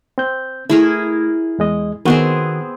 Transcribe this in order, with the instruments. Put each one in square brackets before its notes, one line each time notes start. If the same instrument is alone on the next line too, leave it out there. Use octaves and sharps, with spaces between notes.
[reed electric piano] C4 G6
[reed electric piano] A3 [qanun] E4 G#4 A#4
[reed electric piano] E2 G#3 D#5
[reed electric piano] D#3 F#4 F#6 [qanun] B3 C4 G#4